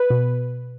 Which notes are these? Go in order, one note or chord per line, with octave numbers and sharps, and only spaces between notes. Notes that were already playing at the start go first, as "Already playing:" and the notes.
Already playing: B4
B2